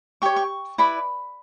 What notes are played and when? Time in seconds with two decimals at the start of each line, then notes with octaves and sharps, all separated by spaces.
0.22 G4 C#5 C#6
0.36 C#6
0.78 E4 B4 D5 B5